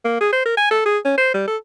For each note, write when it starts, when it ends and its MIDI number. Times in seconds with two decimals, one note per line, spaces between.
0.05 0.16 58
0.21 0.29 68
0.32 0.44 72
0.46 0.53 70
0.57 0.71 80
0.71 0.82 69
0.86 0.98 68
1.05 1.14 61
1.18 1.33 72
1.34 1.43 55
1.48 1.57 69